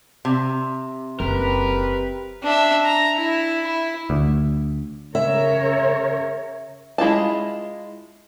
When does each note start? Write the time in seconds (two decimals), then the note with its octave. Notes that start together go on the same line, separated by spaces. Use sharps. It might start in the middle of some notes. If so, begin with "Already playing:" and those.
0.25 C3
1.20 F#1 C4 G4 A#4 B4
2.43 D4 E5
2.85 A#5
3.16 E4
3.67 E4
4.10 D2
5.15 C#3 A#4 C#5 E5
6.98 G#3 E4 F4 A5